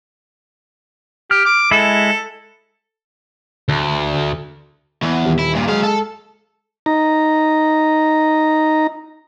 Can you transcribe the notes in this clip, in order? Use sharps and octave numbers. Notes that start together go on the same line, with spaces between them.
G4 F6
D6
G#3 E4 A4
D2
E2 E3
D#1
E4
G2 A#2
F#3 G#3 F5
A4
D#4 A#5